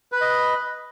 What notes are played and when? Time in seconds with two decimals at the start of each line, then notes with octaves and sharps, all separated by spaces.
0.12 B4
0.16 B5
0.21 D#5